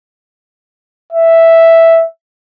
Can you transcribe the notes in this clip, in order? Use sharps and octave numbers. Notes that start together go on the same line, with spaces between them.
E5